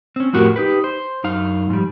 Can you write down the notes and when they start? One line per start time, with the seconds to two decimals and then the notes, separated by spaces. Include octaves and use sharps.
0.16 C4 C#4
0.33 F2 A2 F#4 G4 A#4
0.56 D#4 G4 B4
0.84 C5
1.24 F#2 D#4 F5
1.70 G#2 F3 G3